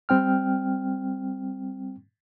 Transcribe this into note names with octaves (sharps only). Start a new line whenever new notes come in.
G3 C4 G5 F6